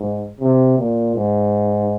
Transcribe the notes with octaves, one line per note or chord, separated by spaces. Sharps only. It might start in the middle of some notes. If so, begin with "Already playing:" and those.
Already playing: G#2
C3
A#2
G#2